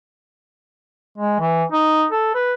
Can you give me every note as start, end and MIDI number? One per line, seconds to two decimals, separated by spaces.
1.18 1.38 56
1.40 1.63 52
1.72 2.05 63
2.11 2.34 69
2.35 2.53 71